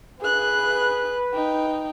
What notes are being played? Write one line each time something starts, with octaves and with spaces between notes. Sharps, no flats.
G#4 B4 F#6
D#4 G5